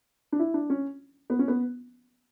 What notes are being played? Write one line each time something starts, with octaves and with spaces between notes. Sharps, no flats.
D4
E4
D4
C#4
B3
C#4
B3